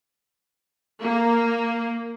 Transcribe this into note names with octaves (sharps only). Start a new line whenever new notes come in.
A#3